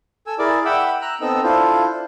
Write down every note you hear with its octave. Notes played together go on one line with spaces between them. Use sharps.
A4 G#5 E6
E4 G#4 A#4 D5 D6
E5 F#5 G5 B5 D6 E6
A#5 E6 F#6
B3 C4 D#4 A4 D#5 E6
D4 E4 F4 A4 C5